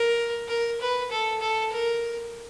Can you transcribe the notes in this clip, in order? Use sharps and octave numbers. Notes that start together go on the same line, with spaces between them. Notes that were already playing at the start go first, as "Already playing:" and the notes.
Already playing: A#4
A#4
B4
A4
A4
A#4